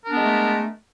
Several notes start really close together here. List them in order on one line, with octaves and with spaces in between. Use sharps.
A#4 D4 B3 G#3 A3